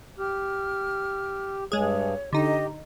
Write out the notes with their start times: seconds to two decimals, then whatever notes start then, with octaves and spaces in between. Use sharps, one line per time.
0.19 G4 F6
1.72 G2 G#3 G#4 C#5
2.33 D3 D#4 G4 D#5